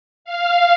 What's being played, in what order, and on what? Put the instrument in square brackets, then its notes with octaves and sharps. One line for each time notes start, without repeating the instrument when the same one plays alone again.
[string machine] F5